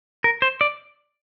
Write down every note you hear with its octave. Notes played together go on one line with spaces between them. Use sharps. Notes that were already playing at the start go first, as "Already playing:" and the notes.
A#4
C5
D5